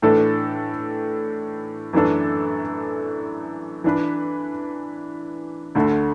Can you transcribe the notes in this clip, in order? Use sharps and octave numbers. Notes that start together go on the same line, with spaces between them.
A2 E3 A3 D4 A4
F#2 E3 A3 D4 A4
E3 D4 B4
D2 D3 A3